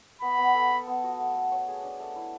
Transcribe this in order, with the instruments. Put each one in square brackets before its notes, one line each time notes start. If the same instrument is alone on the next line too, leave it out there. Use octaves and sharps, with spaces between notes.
[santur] B3 [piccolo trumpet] B5
[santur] B3
A4
A4
B3
F#4
A3
A3
C#5
G#4
D4
A3
E4